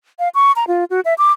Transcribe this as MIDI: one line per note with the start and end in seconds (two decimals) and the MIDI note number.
0.19 0.29 77
0.35 0.52 85
0.56 0.65 82
0.68 0.84 65
0.90 1.00 66
1.05 1.14 76
1.18 1.32 86